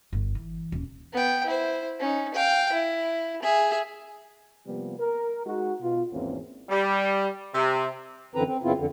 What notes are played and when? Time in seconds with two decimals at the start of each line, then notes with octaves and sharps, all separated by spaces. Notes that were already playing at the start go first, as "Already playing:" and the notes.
0.13 G1
0.35 E3
0.72 D#1
1.12 B3 G5
1.46 E4 C5
2.00 C#4 D#4
2.34 F5 G5
2.72 E4
3.42 G#4 E5
4.66 C3 F3 G3 A#3 B3
4.98 A#4
5.45 G#3 D#4 F#4
5.81 B2 F4
6.12 G#1 E2 A#3 C4 C#4
6.70 G3
7.54 C3
8.35 F#2 D3 E3 C4 B4 A#5
8.47 C4
8.63 F#2 C#3 B3 C4 E4 F4
8.78 F2 D3